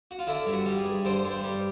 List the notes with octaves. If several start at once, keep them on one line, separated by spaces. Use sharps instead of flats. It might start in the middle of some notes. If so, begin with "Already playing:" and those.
F#4
F4
D3 E4
G2
F#4
G3
G#4
G2
D3 C5
G2
C5
G3